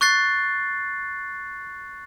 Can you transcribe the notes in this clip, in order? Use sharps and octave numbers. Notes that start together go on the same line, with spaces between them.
C#6 F#6 A6 C7